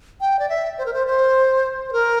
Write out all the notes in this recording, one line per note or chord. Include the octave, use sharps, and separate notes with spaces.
G5
D5
E5
C5
A#4
C5
C5
C5
A#4